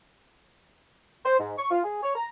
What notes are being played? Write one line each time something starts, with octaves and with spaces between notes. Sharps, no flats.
C5
G#2
C#6
F4
G#4
C#5
A#5